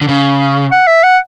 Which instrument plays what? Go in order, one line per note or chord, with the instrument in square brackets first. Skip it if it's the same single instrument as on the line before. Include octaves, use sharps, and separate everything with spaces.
[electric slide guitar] D3
C#3
[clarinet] F#5
E5
F#5